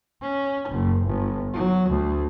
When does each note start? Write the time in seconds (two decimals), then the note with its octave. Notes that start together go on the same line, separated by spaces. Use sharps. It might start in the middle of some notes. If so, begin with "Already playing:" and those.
0.22 C#4
0.69 F#1
1.04 G1
1.54 F#3
1.89 D2